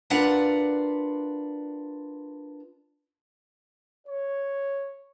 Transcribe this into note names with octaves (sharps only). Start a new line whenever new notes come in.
D4 F4 A#4 B4 D5 F#5
C#5